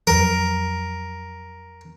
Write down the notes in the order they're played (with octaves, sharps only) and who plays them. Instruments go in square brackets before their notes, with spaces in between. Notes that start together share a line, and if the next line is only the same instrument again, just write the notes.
[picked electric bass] F2 F#3 [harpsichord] A#4